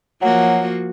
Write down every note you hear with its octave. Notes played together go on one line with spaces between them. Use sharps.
F3 F#3 A#3 F#4